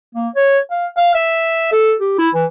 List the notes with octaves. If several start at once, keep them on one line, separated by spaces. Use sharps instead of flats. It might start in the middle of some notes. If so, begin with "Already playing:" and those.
A#3
C#5
F5
F5
E5
A4
G4
E4
E3